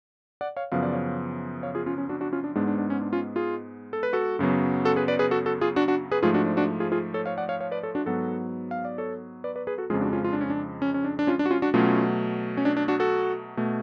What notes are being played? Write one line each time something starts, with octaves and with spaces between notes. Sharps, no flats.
D5 F#5
C#5 F5
F#2 C#3 F3 B3 F5
D5
C#5 F5
C#5 F5
F4 G#4
C#4 F4
C#4
D4 F#4
D4 F#4
C#4 F4
D4
G#2 G#3 B3 D4
D4
D4
C#4
D4
C#4 F4
F4 G#4
A4
B4
F#4 A4
F#2 C#3 F#3 B3
F#4 A4
G#4 B4
B4 D5
G#4 B4
F#4 A4
F#4 A4
F4 G#4
D4 F#4
D4 F#4
G#4 B4
G#2 F3 A3 F4 G#4
D4 F#4
D4
D4 F#4
F4 G#4
F4 G#4
A4 C#5
C#5 F5
D5 F#5
C#5 F5
C#5 F5
B4 D5
A4 C#5
D4 F#4
G#2 F#3 B3 F#4 A4
F5
D5
A4 C#5
B4 D5
B4 D5
G#4 B4
F#4 A4
F2 C#3 F3 G#3 F4 G#4
D4 F#4
C#4 F4
F4
D4
C#4
D4
C#4
C#4
D4
D4
C#4 F4
D4
F#4
C#4 F4
D4 F#4
B2 F#3 A3 C#4 F4
C#4
D4
D4
D4 F#4
F#4 A4
B2 A3